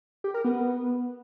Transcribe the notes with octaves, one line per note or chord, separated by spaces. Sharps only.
G4
A#4
B3